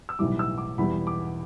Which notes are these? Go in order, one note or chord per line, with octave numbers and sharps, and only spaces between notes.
E6
B1 A2 E3 G3 D6
E6
D6
E1 E2 E3 G3 B5
D6